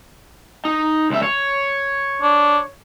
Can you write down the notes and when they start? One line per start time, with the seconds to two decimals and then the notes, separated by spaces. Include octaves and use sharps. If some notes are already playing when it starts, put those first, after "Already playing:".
0.65 D#4
1.10 C#2 E5
1.23 C#5
2.22 D4